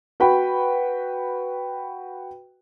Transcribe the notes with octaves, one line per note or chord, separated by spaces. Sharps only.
F#4 B4 G5 B5